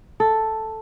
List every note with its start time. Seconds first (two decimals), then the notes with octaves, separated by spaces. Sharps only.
0.20 A4